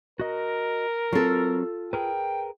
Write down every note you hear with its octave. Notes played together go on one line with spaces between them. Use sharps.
F#4 A#4 D#5
F#3 C4 F4 A4
G#4 A#4 B4 G5